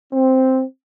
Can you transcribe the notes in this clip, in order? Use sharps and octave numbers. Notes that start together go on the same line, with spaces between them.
C4